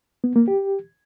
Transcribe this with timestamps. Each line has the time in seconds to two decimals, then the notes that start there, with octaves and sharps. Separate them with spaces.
0.24 B3
0.36 A#3
0.48 G4